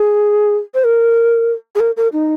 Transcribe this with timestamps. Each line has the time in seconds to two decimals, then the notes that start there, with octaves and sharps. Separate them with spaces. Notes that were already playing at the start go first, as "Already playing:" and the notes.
Already playing: G#4
0.74 C5
0.84 A#4
1.75 G#4
1.80 A#4
1.97 A#4
2.13 D#4